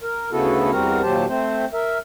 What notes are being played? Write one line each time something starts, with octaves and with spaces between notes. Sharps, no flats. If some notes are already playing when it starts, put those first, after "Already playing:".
A#4
D2 C#3 B3 E4 F#4 A4
E2 G3 C4 F#4 A#4 A#5
D#2 A#2 F#3 G4 C5 A5
A3 C4 C5
A#4 E5